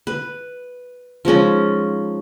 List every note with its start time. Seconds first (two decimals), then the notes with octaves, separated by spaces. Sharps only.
0.07 B4
1.25 F3 G#3 C#4 D#4